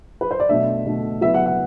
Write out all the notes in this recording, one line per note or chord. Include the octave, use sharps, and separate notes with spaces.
B4
C5
D5
B2 A3 D4 E5
B2 A3 D4
F#3 B3 E4 E5
F#5
F#5